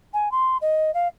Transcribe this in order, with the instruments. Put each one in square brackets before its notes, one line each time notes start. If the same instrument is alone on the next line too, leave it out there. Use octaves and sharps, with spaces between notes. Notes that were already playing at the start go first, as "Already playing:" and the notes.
[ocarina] G#5
C6
D#5
F5